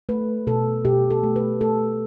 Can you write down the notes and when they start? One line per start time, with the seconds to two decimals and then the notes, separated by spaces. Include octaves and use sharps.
0.09 A3 B4
0.47 B2 A4
0.85 B2 G4
1.11 A4
1.23 A3
1.36 B4
1.61 A3 A4